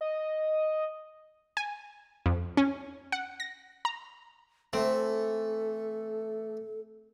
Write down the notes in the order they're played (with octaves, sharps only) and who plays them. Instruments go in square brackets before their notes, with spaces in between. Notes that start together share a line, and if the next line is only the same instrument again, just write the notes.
[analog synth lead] D#5
[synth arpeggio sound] G#5
F2
C#4
F#5
A#6
A#5
[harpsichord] E3 A3 [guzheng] C4 [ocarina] A4